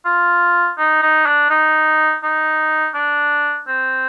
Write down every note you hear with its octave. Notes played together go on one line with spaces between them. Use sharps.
F4
D#4
D#4
D4
D#4
D#4
D4
C4